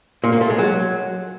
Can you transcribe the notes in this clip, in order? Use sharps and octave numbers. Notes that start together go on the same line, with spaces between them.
A#2
A#3
A3
G#3
F#3